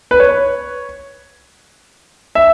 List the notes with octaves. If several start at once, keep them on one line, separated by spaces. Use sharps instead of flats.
B4
C#5
E5